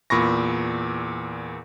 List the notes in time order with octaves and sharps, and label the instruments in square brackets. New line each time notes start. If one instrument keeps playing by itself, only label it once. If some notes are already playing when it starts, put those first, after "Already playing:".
[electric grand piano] E2 A#2 B5 C#6 A#6